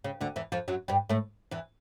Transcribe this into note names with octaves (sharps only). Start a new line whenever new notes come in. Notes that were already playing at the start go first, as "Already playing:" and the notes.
C#3
D2 D3
E2 E3
F2 F3
F#2 F#3
G2 G3
A2 A3
E2 E3